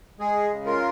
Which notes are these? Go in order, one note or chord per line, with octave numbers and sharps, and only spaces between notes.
G#3 G#4
C#3
F4 A#4